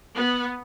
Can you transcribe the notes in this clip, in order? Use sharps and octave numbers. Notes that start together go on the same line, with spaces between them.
B3